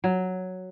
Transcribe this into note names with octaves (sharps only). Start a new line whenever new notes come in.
F#3